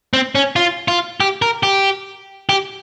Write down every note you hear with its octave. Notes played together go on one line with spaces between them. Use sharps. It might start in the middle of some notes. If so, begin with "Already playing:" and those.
C4
C#4
F4
F4
G4
A#4
G4
G4